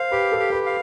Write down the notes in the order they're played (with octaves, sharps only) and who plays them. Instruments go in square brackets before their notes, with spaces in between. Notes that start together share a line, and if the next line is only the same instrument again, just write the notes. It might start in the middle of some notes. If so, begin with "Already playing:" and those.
Already playing: [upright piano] C5 [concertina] F5
[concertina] G4 [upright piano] B4
[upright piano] A4
[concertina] G4
[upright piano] B4
[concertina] F5